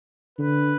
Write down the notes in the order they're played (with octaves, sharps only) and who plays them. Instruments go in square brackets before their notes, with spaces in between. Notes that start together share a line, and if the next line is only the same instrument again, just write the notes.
[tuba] D3 [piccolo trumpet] B4